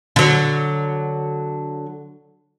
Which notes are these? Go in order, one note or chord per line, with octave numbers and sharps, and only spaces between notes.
D3 F#3